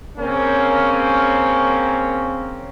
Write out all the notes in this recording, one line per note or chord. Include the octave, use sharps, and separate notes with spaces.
C#3 A#3 C4 C#4